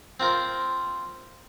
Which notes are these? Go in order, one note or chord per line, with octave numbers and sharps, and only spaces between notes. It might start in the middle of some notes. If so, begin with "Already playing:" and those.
C4 F4 A#4 C5